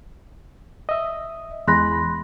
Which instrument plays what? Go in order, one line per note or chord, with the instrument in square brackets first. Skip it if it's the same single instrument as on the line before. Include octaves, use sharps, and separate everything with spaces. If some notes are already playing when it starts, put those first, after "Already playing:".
[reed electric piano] D#5 E5
[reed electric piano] E2 G#3 B5 [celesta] C6 F#6 A#6